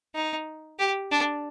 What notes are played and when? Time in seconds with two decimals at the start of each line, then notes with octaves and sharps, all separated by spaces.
0.15 D#4
0.79 G4
1.12 D4